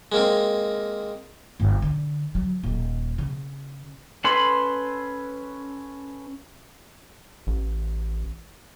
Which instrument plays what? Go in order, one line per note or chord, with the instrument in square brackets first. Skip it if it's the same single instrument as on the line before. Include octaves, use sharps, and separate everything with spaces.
[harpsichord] G#3 A#3 C4
[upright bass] G1
D3
F#3
D#1
C#3
[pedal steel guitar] C#4 A4 B4 B5 C6
[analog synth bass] A1